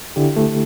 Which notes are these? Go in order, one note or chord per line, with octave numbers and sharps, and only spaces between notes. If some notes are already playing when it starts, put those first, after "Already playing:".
D3 E4 G4
A3